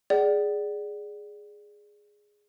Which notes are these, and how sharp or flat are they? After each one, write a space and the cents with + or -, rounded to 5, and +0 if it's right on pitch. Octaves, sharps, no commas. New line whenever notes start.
G#4 +0 D5 +0 F#5 +40